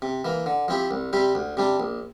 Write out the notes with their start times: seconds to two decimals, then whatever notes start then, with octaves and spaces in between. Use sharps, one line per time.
0.02 C3
0.25 E3 A#3
0.46 D3
0.68 F3 C4 E4 G4
0.91 C2
1.13 C3 G3 C4 G4
1.35 D2
1.57 C3 G3 D4
1.80 A#1